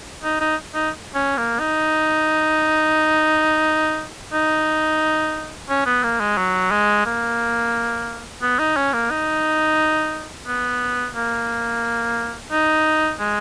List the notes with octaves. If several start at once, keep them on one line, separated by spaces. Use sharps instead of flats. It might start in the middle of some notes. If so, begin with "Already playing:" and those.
D#4
D#4
D#4
C#4
A#3
D#4
D#4
C#4
B3
A#3
G#3
F#3
G#3
A#3
B3
D#4
C#4
A#3
D#4
B3
A#3
D#4
G#3